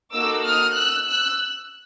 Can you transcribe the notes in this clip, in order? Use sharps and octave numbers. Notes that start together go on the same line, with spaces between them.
A#3 D#4 F#4 A4 D6 E6
D#6 F6
E6 F#6
E6 F#6